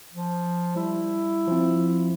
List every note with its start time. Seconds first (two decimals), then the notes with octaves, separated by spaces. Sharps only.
0.14 F3
0.76 G3 E4
1.47 F3 C4